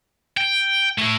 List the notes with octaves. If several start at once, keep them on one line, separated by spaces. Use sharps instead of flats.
G5
A3 E4